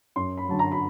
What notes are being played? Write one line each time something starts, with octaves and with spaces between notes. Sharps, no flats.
F#2 C6
B5
D3 F#3 A5
A#5
B5